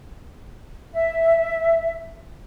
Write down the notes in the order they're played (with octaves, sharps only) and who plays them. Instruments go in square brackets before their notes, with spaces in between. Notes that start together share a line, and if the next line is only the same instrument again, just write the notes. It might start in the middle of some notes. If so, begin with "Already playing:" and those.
[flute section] E5